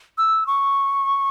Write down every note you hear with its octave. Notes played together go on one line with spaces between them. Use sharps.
E6
C#6